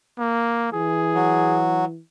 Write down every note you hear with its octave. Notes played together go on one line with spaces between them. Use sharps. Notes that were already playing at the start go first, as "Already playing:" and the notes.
A#3
E3 G#4
F#3